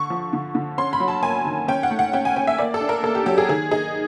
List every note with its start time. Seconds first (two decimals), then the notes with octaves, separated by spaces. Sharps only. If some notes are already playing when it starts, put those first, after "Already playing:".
Already playing: D3 C#6
0.10 F3
0.33 D3
0.55 D3
0.78 C#4 C6
0.93 B5
1.00 F#3
1.08 A5
1.23 A#3 G#5
1.45 D#3
1.68 C#4 G5
1.83 F#5
1.91 A3
1.99 F#5
2.13 C#4 G5
2.25 G#5
2.36 C#4 G5
2.47 E5
2.58 A#3 D5
2.74 A4
2.81 D4
2.89 A#4
3.03 A#3 A4
3.15 G4
3.26 F#3 G4
3.38 G#4
3.49 D#3 G#4
3.71 D#4 G#4